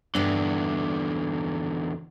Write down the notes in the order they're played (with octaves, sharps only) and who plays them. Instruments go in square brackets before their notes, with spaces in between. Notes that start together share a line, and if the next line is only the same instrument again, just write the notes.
[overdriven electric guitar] E2 D3 [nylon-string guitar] G2 D4